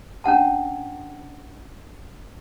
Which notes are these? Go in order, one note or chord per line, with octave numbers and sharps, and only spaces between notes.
C#4 D4 F#5 A5